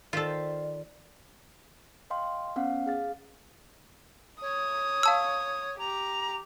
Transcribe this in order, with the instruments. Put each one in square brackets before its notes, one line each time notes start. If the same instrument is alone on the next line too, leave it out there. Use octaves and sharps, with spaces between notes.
[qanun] D#3 C5 E5 [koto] F4 A4 [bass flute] D5
[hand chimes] D#5 F5 G5 C6
B3 C#4 F5 F#5
G#4 F5 A6
[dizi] C#5 [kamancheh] D#6
[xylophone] F5 A5 E6
[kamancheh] G4 [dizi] A#5